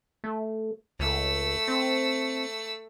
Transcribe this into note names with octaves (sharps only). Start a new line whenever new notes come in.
A3
C#2 A3 E6
C4